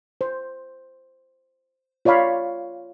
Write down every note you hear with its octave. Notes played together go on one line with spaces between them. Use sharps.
C5
F4 C#5 D5 F5 B5